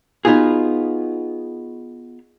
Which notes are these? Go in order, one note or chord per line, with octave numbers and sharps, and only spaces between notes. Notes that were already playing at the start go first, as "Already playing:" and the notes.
B3 D#4 F4 F#4 G#4